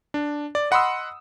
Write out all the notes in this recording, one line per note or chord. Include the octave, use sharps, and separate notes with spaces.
D4
D5
D#5 F#5 B5 C6 D#6 E6